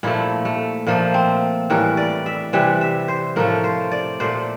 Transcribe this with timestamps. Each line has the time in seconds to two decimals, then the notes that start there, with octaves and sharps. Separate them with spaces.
0.03 A#2 F3 A3 E4
0.45 A3
0.87 A#2 F3 A3 A#3
1.14 C4
1.70 A2 E3 G3 A#4
1.97 D5
2.26 E5
2.53 C3 E3 G3 E5
2.81 E5
3.08 C5
3.36 A2 F3 A3 A#4
3.64 C5
3.91 D5
4.20 A#2 A3 C5